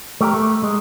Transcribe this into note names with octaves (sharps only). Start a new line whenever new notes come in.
A3 G4 A#4
A3
G#3